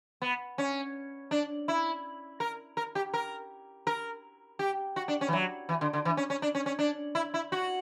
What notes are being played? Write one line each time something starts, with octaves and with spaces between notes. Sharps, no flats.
B3
C#4
D4
E4
A#4
A#4
G4
A#4
A#4
G4
F#4
D4
C#4
E3
F#3
E3
D3
D3
E3
C#4
C#4
D4
C#4
C#4
D4
E4
E4
F#4